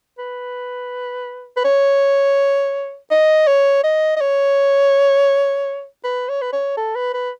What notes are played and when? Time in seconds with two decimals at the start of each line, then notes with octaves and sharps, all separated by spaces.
0.18 B4
1.56 B4
1.64 C#5
3.11 D#5
3.47 C#5
3.84 D#5
4.16 D#5
4.21 C#5
6.04 B4
6.29 C#5
6.41 B4
6.53 C#5
6.77 A4
6.95 B4
7.14 B4